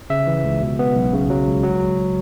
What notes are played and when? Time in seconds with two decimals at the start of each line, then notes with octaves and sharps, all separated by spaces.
0.10 C#3 E5
0.27 E3
0.45 C#2
0.62 B2
0.79 B3
0.96 B1
1.13 C#3
1.30 F#3
1.47 C#2
1.63 F#3